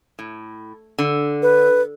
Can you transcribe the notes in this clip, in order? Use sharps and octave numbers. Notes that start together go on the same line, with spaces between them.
A2
D3
B4